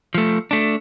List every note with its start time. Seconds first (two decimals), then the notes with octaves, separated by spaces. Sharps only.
0.14 F3 A3
0.51 A3 D4